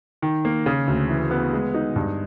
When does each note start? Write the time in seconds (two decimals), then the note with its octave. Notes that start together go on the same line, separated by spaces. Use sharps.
0.22 D#3
0.45 A#3
0.66 C#3
0.87 D2
1.09 E3
1.31 B3
1.53 G#3
1.74 D#4
1.96 G2